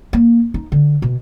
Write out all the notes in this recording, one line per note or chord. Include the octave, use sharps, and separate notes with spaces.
A#3
D#4
D3
B2